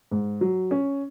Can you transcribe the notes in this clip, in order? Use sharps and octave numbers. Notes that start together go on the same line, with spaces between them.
G#2
F#3
C#4